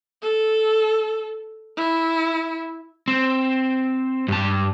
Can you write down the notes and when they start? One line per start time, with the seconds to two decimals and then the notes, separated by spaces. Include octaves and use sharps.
0.22 A4
1.77 E4
3.08 C4
4.28 G2 A5